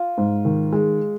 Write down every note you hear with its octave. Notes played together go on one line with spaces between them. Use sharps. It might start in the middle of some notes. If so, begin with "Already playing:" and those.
Already playing: F4
G#2
D#3
G#3